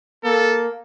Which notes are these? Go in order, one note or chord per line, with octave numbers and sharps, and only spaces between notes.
A#3 A4